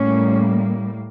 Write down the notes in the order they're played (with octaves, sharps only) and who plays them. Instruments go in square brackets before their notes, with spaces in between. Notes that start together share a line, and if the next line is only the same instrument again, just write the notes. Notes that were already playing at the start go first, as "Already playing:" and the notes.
Already playing: [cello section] A2 G3 A#3 C#4